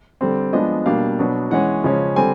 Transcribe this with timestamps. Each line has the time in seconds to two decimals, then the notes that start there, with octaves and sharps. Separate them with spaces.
0.21 D3 G3 C4
0.53 F3 G#3 B3 D4 D#5
0.85 B2 G3 A#3 D4 F5
1.19 B2 F#3 B3 D4
1.51 E3 G#3 C#4 F#5
1.84 C#3 F3 G#3 C#4
2.16 D3 G3 C4 G#5